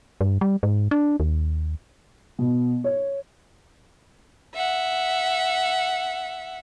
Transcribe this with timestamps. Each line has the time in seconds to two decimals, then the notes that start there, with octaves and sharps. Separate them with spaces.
0.21 G2
0.41 G3
0.63 G#2
0.91 D4
1.20 D#2
2.39 B2
2.84 C#5
4.55 E5 F#5